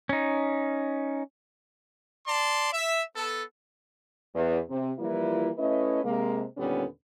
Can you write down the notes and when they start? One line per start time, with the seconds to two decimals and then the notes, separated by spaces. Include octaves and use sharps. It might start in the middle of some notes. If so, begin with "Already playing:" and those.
0.09 C#4 D#4
2.26 D5 A5 C6
2.73 E5
3.16 B3 A4
4.35 E2
4.70 C3
4.99 E3 F3 G3 A#3 E4 F4
5.58 A3 C#4 E4 B4 D#5
6.04 C3 G#3 A#3
6.57 D#2 A#2 D3 G3 B3 C#4